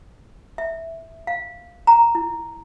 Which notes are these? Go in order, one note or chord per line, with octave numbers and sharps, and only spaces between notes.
E5
F5
A#5
E4